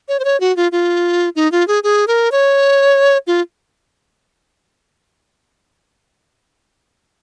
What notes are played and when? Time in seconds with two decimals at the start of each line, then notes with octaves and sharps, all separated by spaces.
0.08 C#5
0.19 C5
0.25 C#5
0.40 F#4
0.56 F4
0.72 F4
1.36 D#4
1.52 F4
1.68 G#4
1.84 G#4
2.08 A#4
2.32 C#5
3.27 F4